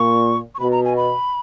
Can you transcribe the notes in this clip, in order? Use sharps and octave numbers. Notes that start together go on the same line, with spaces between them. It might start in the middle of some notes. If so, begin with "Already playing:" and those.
Already playing: A#2 C#6
C#6
B2 B5
A#5
G#5
B5